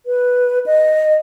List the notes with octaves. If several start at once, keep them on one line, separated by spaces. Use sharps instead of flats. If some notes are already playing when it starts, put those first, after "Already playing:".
B4
D#5